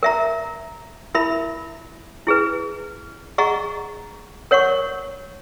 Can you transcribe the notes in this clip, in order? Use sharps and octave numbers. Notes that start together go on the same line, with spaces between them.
A#4 E5 A#5
E4 A#4 E5 B5
E4 G#4 B4
G#4 D#5 F#5 A#5 C#6
A#4 C#5 F#5 C#6